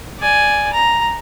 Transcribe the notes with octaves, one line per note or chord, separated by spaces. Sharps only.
D5 G#5
A#5